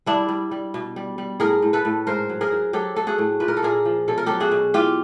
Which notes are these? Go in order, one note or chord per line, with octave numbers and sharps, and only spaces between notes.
G3 D4 E4
G3
G3
B2
G3
G3
A2 G#4 A#4
A2
A4 B4
A2
G#2 A#4 C5
F#3
G#4 A#4
F#3
F#3 G4 A4
F#3 A4
F#4 G#4
A2
A#2 B4
A#4
A4
A#2 G#4 A#4
F3
B2 A4
A#4
F#3 G4 A4
F#4 G#4
B2
E3 F4 G4